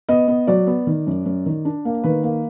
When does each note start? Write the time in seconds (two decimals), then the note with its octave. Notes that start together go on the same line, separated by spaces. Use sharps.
0.09 B3 D#5
0.28 B3
0.47 F#3 D5
0.67 B3
0.87 D#3
1.07 F#2
1.26 F#2
1.46 D#3
1.65 D4
1.85 A#3
2.03 D#3 B4
2.23 A#3